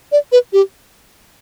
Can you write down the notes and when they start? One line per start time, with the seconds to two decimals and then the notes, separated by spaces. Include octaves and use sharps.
0.12 D5
0.32 B4
0.53 G4